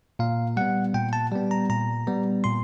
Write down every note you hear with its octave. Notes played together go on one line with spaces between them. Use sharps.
A#2 F5
G3 B3 F#5
A#2 G5
A5
G3 B3
A#5
A#2 A#5
G3 B3
A#2 C6